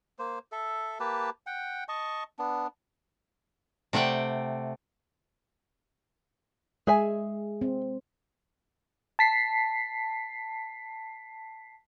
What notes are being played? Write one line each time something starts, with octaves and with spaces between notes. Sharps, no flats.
A#3 C5
A4 E5
A#3 G4 B4 A5
F#5 G5
D#5 A5 C#6
B3 D4
C3 A3 D5 F#5 G5
G#3 G#4 E5 G#5
C4
A5 B6 C7